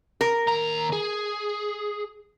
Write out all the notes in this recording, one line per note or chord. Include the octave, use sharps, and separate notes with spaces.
A#4
D#2 A#5
G#4